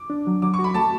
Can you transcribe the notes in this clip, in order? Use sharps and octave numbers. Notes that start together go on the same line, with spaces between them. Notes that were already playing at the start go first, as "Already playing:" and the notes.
Already playing: D6
D4
F#3
F#3 D6
C#6
F#4
B5
A3 A5